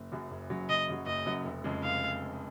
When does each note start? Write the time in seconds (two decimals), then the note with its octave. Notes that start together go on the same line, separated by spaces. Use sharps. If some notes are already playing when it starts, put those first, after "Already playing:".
Already playing: F#1
0.12 F#2 C#3 F#3
0.31 F#1
0.50 F#2 C#3 F#3
0.70 F#1 D#5
0.88 F#2 C#3 F#3
1.06 F#1 D#5
1.26 F#2 C#3 F#3
1.44 F1
1.64 F2 C#3 G#3
1.83 F1 F5